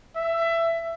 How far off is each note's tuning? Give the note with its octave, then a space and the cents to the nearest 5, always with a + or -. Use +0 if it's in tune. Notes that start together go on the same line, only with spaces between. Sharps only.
E5 +20